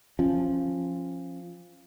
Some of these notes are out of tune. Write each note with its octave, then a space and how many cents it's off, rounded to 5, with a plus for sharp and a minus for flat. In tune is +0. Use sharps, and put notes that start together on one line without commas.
F3 -5 C#4 -25